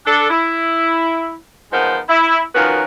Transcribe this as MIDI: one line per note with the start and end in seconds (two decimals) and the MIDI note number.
0.06 0.28 62
0.06 0.28 69
0.30 1.34 64
1.72 1.99 53
1.72 1.99 56
1.72 1.99 59
1.72 1.99 63
1.72 1.99 70
1.72 1.99 72
2.09 2.40 64
2.55 2.84 51
2.55 2.84 53
2.55 2.84 61
2.55 2.84 66
2.55 2.84 70
2.55 2.84 71